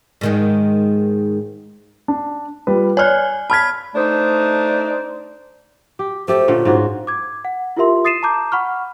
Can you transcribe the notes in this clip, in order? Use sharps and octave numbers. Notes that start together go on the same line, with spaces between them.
G#2 D#3 G#3
D4
G3 F4 B4
C#5 D5 G#5 F6 F#6
A5 B5 F6 G#6 B6
A3 D4 D#4 C5
G4
A3 G4 A4 C5
A#2 D3 C#4
G#2 F4 F#4
D6 G#6
F#5
E4 F4 G4 A#4 E5 C6
D#6 A6 C7 D#7 E7
A5 A#5 D6 G6
F#5 B5 C#6 F6